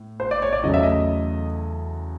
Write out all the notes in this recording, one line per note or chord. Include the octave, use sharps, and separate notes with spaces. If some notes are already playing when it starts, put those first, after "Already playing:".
Already playing: A2
C5
D5
C#5
D5
E2 C#3 F#3 A3 D#5
E5
D#5